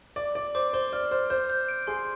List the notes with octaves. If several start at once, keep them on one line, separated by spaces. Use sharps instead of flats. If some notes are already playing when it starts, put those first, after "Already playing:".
D5 D6
D5 D6
C5 D6
C5 G7
D5 F6
C5 F6
C5 G6
G6
D7
G#4 C6